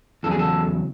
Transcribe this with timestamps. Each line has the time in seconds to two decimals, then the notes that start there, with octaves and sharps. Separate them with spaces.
0.23 E2 C#3 F#3 A4
0.31 G#4
0.39 A4